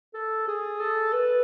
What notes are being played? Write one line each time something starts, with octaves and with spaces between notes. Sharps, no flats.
A4
G#4
A4
B4